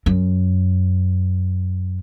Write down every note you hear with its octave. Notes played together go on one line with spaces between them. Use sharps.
F#2